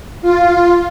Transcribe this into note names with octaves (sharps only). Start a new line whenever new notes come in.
F4